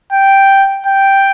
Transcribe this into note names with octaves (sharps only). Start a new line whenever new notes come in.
G5
G5